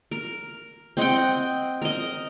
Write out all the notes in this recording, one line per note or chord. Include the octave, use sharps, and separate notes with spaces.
A#4
C4 D#5 F#5 G5
A#4 D#5